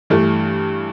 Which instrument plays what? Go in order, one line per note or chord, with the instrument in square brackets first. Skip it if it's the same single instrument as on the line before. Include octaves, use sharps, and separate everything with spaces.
[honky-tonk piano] G2 E3 A3